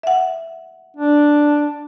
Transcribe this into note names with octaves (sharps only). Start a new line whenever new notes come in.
E5 F#5
D4